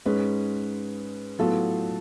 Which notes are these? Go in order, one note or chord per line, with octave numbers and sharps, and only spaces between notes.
G#2 G#3 C#4 G#4 B4
A2 F#3 B3 F4 A4